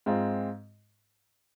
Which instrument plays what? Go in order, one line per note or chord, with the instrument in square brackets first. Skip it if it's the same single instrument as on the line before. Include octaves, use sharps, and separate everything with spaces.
[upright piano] G#2 G#3 C4 F4